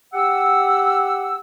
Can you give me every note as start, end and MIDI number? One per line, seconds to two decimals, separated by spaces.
0.13 1.38 67
0.13 1.38 78
0.13 1.38 88